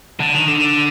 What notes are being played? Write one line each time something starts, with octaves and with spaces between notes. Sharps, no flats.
D3
D#3
D3